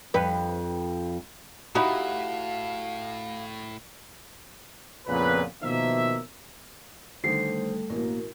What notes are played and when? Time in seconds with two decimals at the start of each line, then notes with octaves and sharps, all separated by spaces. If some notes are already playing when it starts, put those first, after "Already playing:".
0.14 F2 B4
1.75 A2 D#4 E4 F#4 G4 F5
5.07 F2 A#2 C#3 B3 B4
5.62 B2 D#3 F3 A#3 E5
7.24 D3 D#3 G3 A3 A4 C5 C7
7.90 A1 B2 A#3 A#4